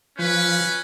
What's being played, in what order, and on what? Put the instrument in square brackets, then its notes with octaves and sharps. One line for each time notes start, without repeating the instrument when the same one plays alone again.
[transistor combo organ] F3 [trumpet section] C#4 B4